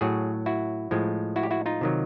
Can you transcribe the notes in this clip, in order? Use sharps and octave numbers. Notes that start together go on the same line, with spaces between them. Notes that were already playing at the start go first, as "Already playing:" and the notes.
A2 F#3 F#4 G#4
E4 F#4
A2 F3 G#3
E4 F#4
G4
E4 F#4
D#4 F4
C3 D#3 F#3